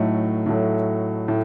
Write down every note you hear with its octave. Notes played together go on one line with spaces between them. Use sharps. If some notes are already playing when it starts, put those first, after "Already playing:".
Already playing: A2 F#3 A3 D#4
A2 F#3 A3
A2